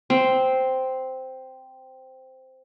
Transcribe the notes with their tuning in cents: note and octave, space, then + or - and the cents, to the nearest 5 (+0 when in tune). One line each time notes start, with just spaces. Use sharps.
C4 -5